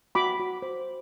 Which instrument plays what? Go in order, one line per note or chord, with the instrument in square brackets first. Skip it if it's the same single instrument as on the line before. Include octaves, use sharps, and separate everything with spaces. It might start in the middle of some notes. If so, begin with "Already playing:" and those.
[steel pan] F#4 B5 D6
F#4
C5